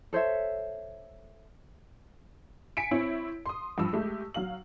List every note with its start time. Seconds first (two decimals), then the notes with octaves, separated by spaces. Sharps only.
0.13 A4 C5 C#5 E5
2.77 G#5 B6 C#7 D7
2.91 C4 E4 C#5
3.46 C6 D#6
3.78 G2 F3 E6
3.93 G#3 A3 G4
4.34 F#3 F5 F#7